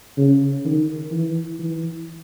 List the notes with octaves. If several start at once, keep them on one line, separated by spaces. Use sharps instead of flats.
C#3
D#3
E3
E3